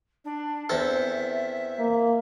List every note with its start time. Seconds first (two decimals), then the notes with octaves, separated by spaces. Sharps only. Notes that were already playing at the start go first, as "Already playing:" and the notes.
0.25 D4
0.69 E2 C4 A4 E5
1.79 A#3